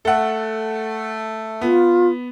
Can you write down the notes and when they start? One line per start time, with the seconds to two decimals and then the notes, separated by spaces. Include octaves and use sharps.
0.05 A3 A4 F#5
1.61 B3 F4